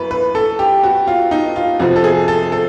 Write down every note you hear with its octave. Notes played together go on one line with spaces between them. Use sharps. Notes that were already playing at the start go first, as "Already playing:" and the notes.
Already playing: F#2 E3 B4
B4
A4
G4
F#4
F4
D#4
F4
F2 C3 F3 F#4
A4
G#4
A4
A4